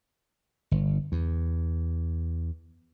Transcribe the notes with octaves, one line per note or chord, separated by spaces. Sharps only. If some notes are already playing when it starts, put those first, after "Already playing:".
G1
E2